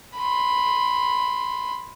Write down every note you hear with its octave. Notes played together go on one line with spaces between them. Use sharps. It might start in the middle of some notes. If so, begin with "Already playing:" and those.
B5 C6